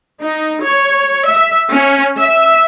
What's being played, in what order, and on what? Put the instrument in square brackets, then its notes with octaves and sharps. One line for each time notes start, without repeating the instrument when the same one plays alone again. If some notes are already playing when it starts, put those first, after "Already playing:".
[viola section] D#4
C#5
E5
C#4
E5